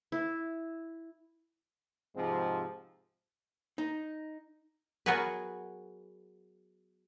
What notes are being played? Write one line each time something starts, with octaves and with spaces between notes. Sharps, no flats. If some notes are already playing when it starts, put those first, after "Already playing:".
E4
G#2 C3 F3 G#3 C4
D#4
F#3 B3 F#4 G#4 A#4 B4